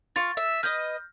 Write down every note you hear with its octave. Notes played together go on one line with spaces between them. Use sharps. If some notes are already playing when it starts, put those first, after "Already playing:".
F4 C#6 A6
E5
B4 D#5 F6 G6